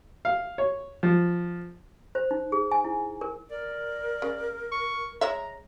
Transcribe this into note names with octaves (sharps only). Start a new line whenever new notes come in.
F5
C#5
F3
C5
D#4
G#4
G#5
E4
A#4
A#4 D5
C#3
C#6
G#3 C#5 E5 A#5